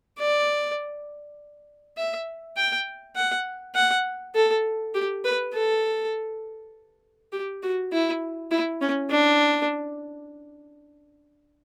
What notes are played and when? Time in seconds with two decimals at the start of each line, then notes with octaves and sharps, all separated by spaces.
0.19 D5
1.97 E5
2.57 G5
3.16 F#5
3.75 F#5
4.35 A4
4.95 G4
5.25 B4
5.54 A4
7.32 G4
7.63 F#4
7.92 E4
8.51 E4
8.82 C#4
9.10 D4